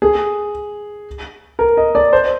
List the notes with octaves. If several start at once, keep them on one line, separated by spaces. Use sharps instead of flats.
G#4
A#4
D#5
D5
C5